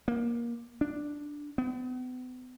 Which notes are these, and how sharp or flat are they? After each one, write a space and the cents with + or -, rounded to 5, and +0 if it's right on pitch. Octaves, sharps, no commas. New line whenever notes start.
A#3 +20
D4 +0
B3 +40